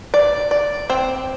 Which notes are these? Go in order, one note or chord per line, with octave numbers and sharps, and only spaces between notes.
D5
D5
C4